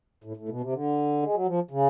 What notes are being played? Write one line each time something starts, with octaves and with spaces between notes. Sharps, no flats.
A2
A2
B2
C3
D3
G#3
F#3
F3
C#3